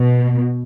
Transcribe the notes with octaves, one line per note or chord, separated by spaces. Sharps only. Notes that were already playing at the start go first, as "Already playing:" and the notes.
Already playing: B2